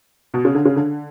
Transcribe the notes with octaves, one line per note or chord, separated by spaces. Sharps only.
B2
C#3
D3
C#3
D3